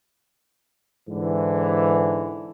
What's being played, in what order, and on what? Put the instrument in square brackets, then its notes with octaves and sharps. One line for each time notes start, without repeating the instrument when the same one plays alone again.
[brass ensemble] G#2 D3 E3